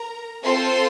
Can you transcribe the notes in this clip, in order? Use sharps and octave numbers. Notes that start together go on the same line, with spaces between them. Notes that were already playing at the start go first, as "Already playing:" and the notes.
Already playing: A#4 A#5
C4 F4 A4 C5 C6